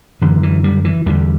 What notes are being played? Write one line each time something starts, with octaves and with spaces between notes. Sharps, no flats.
F#2 D3 E3
E3
G3
E3
E2 D3 G3